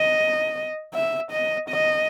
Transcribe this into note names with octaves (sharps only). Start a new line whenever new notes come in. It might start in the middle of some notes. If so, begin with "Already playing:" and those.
Already playing: D#5
E5
D#5
D#5